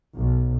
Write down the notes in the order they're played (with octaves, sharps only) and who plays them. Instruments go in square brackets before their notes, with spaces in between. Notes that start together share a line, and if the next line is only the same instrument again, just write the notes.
[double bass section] B1